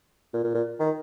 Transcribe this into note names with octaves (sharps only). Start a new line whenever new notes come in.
A#2
A#2
A#2
D#3